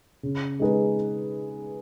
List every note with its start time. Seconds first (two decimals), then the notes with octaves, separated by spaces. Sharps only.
0.23 C#3
0.59 G#3 D#4 G#4 B4